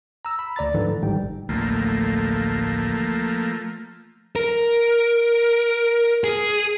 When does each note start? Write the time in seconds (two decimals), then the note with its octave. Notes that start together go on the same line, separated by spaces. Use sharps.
0.25 A#5 E6
0.39 B5
0.56 D2 D5 A#5 A6
0.74 G#2 D3 E3 F3
1.01 G#1 G#2 G3 G5
1.49 A1 D2 F3 A3 A#3
4.36 A#4
6.24 G#4